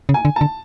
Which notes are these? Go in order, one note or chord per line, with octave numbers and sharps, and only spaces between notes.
C#3
G#5
D3
D3 A5